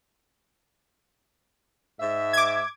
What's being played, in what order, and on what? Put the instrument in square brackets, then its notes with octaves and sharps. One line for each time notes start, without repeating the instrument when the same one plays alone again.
[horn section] G#2 E5
[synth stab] D6 G#6